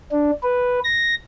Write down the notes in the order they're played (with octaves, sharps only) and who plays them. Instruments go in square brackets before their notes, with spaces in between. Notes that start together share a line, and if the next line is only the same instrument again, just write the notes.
[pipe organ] D4
B4
A#6